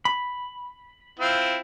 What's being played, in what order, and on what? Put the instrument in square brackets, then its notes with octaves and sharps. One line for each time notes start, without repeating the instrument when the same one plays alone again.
[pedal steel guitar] B5
[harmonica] C4 E4 F4